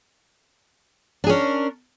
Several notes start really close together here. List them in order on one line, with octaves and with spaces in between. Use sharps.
D4 G#4 C#4 A#4